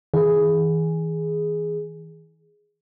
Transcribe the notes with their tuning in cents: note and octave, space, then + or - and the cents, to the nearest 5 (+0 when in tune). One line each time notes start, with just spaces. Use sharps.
E3 -40 G#4 +0